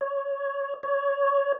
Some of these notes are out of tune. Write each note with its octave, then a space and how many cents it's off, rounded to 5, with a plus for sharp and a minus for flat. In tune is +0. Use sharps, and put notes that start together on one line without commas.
C#5 +10
C#5 +15